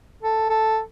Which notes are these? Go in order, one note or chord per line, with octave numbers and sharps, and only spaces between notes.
A4
A4